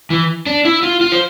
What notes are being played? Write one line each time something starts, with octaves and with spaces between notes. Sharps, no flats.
E3
D4
E4
F4
F4
C5